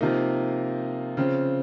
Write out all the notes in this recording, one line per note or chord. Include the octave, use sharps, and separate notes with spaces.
C3 F3 A#3 D#4
C#3 F3 C4